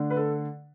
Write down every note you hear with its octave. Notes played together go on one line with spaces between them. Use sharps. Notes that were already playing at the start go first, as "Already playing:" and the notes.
Already playing: D3 A3 D4
B4
A4